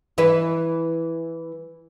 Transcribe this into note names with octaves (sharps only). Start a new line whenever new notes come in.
E3 E4 B4